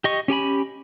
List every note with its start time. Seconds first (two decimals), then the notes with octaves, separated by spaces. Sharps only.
0.04 G4 D#5 C#6
0.28 C#4 G4 G#5 B5